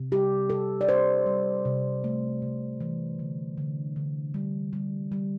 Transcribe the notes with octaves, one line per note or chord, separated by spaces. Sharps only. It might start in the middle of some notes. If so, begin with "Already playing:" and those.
Already playing: C3
G3 G4
C3 A4
D5
G3 C5
G3
C3
A3
C3
E3
D3
D3
D3
G3
G3
G3